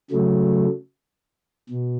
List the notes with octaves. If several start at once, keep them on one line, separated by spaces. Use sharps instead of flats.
C#3 F#3 A3
B2